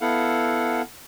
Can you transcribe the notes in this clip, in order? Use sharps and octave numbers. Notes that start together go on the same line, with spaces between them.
B3 E4 A4 F5 F#5